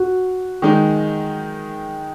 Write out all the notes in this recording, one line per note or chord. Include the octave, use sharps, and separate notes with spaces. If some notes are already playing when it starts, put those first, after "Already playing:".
Already playing: F#4
D#3 G#3 D#4